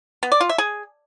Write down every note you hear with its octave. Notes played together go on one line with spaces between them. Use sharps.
B3
D5
F4
E5
G#4